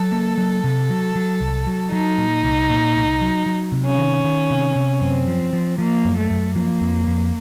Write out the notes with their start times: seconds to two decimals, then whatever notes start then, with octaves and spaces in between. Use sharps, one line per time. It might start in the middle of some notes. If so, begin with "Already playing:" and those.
Already playing: F#3 A4
0.12 A#3
0.38 F#3
0.64 C3
0.90 F#3
1.16 F#3
1.40 C2
1.67 F#3
1.92 F#3 D#4
2.18 A#2
2.43 C2
2.70 A#2
2.95 C2
3.22 F#3
3.46 F#3
3.72 C3
3.85 C#4
3.98 D#3
4.24 D#3
4.50 C3
4.76 C3
5.01 F#2 C4
5.28 F3
5.53 F3
5.79 F3 A#3
6.05 F#2
6.18 A3
6.30 F#2
6.55 F3 A#3
6.81 F2
7.07 F2